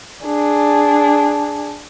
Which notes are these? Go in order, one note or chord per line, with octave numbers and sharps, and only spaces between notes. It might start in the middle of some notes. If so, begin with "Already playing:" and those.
D4 G#4